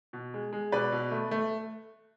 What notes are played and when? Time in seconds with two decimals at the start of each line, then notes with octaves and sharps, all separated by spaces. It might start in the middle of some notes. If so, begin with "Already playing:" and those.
0.13 B2
0.34 G#3
0.53 G#3
0.72 B2 B4 D5
0.92 B2
1.11 A3
1.31 A3